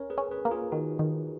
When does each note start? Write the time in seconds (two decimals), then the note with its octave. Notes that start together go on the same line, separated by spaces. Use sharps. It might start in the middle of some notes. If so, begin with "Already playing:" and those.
Already playing: C#4 A#4 C#5
0.10 G#4 B4
0.18 C#4
0.31 G#4 B4
0.45 A#3
0.51 F4 G#4
0.72 D#3 D#4 F#4
0.99 D#3